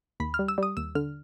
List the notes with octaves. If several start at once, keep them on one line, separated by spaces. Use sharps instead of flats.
D#2 B5
F6
G3
E6
G3 D#6
D#2 E6
D3 F6